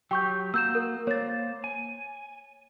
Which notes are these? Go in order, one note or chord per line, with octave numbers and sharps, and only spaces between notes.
F#3 G4 G5 C#6 G6
A#3 F#4 E6 G6 E7
A#4
A#3 C5 C#5 A6
G#5